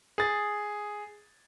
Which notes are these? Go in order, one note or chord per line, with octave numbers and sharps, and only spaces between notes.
G#4 A6